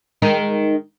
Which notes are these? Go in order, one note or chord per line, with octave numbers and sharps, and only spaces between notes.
D#3 G#3 D#4